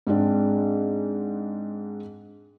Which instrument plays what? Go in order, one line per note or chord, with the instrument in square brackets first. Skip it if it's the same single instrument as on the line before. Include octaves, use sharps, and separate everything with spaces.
[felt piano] G#2 G#3 C4 D4